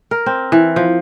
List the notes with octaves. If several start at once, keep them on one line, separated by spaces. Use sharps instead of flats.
A#4
C4
E3
F3